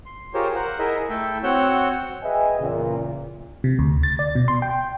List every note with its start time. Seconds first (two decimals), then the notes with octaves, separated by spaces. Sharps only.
0.06 C6
0.34 F4 G4 G#4 A#4 C5 C#5
0.55 A#4 C5 F#5
0.79 E4 G#4 A#4 D#5 E5
1.09 A3 E4 A4 E5 G5
1.43 C4 F#4 C#5 F#5 E6 G6
2.23 G#4 B4 D#5 E5 G5 G#5
2.59 E2 A#2 C#3
3.64 C3
3.79 D2
4.03 A6
4.19 D5
4.35 B2
4.48 C6
4.62 G5